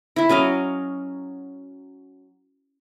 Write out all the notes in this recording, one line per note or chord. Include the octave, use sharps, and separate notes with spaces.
E4 E5
F#3 C#4 D#5 F5